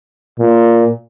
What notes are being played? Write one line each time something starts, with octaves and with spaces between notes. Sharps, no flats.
A#2